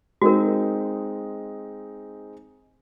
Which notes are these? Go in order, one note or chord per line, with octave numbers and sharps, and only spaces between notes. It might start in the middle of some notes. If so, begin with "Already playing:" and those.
G#3 C4 D#4 F#4 A#4